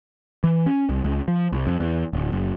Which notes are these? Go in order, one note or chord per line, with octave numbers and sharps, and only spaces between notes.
E3
C#4
C2
C#2
F3
C2
F2
E2
D1
F#1